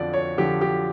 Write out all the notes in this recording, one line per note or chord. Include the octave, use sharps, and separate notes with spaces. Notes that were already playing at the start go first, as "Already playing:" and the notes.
Already playing: F2 D3 F3 D5
C#5
D3 F3 G4
G4